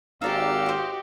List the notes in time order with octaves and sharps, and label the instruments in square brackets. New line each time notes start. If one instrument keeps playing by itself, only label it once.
[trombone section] G#1 [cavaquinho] D#4 D5 A#5 [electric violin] F#4 G4 [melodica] F5 E6
[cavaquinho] C5 D#5